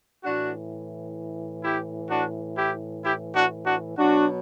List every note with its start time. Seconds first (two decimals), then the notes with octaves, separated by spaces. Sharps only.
0.24 A2 E3 D4 F#4
1.64 E4 G4
2.10 D4 F#4
2.58 E4 G4
3.05 E4 G4
3.36 D4 F#4
3.66 D4 F#4
3.98 B2 F#3 D4 F#4